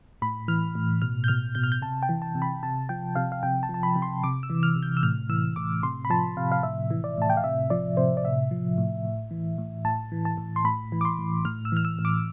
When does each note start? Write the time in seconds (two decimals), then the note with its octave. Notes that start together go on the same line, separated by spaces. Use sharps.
0.22 A2 B5
0.48 E3 F6
0.75 A2
1.02 B2 F6
1.24 G6
1.28 B2 F6
1.55 B2 G6
1.64 F6
1.72 G6
1.82 C3 A5
2.03 G5
2.09 E3
2.22 A5
2.35 C3
2.42 B5
2.63 C3 A5
2.89 F3 G5
3.16 C3 F5
3.32 F5
3.43 C3 G5
3.63 A5
3.69 F3
3.74 A5
3.83 B5
3.96 C3
4.02 C6
4.24 C3 D6
4.43 E6
4.50 E3
4.63 F6
4.76 C3
4.83 G6
4.97 E6
5.03 A2 F6
5.29 E3 E6
5.56 A2 D6
5.83 C3 C6
6.05 B5
6.10 F3 A5
6.37 C3 F5
6.52 F5
6.63 A2 E5
6.90 E3
7.04 D5
7.17 A2 A5
7.30 G5
7.37 F5
7.44 C3 E5
7.70 F3 D5
7.97 C3 C5
8.17 D5
8.24 A2 E5
8.51 F3
8.78 A2
9.05 A2
9.31 E3
9.58 A2
9.85 A2 A5
10.12 E3
10.25 A5
10.38 A2
10.56 C6
10.65 A2 B5
10.92 E3
11.01 D6
11.05 C6
11.19 A2
11.45 A2 F6
11.65 E6
11.72 E3 F6
11.85 E6
11.99 A2
12.05 D6